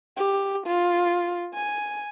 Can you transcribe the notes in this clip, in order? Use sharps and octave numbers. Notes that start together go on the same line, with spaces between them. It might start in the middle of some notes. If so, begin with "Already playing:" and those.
G4
F4
G#5